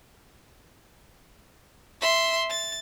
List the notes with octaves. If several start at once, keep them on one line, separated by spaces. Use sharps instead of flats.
E5 C6
A6